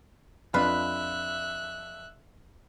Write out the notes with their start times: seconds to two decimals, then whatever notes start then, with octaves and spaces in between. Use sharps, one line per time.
0.54 F2 D4 F4 B4 E5 F#6